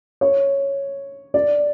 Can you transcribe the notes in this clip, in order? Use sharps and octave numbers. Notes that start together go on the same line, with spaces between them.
C#5
D5